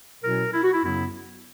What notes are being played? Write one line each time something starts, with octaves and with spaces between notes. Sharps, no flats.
B2 F#3 C#4 E4 A#4
E4
F#4
E4
F#2 C#3 F#3 B3 E4